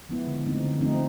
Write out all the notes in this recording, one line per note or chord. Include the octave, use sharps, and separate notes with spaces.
F3 G#3 B3 E4
D3
F3 A3 C4 D#4
D3
F3 A3 C4 D#4